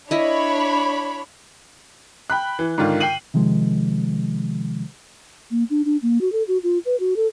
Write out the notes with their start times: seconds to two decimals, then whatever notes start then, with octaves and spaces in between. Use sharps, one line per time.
0.11 D4 E4 C#5 D#5 B5
2.30 G5 B5 F#6
2.59 E3
2.78 G#2 D3 D#3 F4
3.00 G5 C7 D#7 F#7
3.34 C3 D#3 F3 G#3
5.51 A#3
5.70 D4
5.85 D4
6.02 A#3
6.21 F#4
6.32 A4
6.48 F#4
6.63 F4
6.85 B4
7.00 F#4
7.16 A4